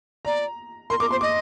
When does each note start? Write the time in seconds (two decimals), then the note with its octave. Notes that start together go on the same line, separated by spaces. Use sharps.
0.25 D5 A#5
0.90 A#4 C6
1.00 A#4 D6
1.11 C5 C6
1.21 D#5 D6